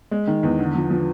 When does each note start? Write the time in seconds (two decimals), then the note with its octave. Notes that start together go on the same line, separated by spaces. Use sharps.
0.11 G#3
0.27 D#3
0.43 E2
0.59 D3
0.75 F3
0.90 F3